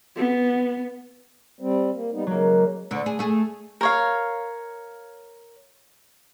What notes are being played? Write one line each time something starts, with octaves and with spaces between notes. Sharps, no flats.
B3
G3 C4
A#3
G3 B3 D#4
C#3 F#3 G#3 A#3
D2 D3
G#4
A3 G#4
A#4 C#5 F5